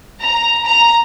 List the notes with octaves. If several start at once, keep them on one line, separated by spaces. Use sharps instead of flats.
A#5
A#5